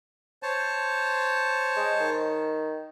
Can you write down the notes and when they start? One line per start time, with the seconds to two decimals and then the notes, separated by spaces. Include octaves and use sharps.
0.43 C5 C#5 A5
1.77 G#3
2.00 D#3